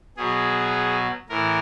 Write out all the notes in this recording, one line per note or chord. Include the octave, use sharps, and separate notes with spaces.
B2 F#3 G#4
A2 E3 A#4